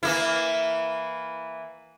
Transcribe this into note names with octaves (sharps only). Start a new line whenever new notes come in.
E3 A#3 E4